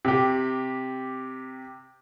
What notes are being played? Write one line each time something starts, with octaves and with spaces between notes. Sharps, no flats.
C3 G4